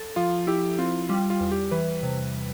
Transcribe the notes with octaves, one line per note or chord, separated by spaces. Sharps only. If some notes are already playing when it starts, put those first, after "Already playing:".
Already playing: A4
F3 F4
E4 G4
C4 F4
G3 F4
F4
E2
G4
E3 B4
C3